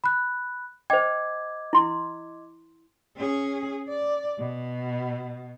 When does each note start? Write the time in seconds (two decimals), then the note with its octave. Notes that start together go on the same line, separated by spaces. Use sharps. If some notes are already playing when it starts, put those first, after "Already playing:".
0.04 B5 F#6
0.90 C5 D#5 G5 D6 G#6
1.73 E4 C6
3.17 C#4 G#4
3.88 D5
4.39 B2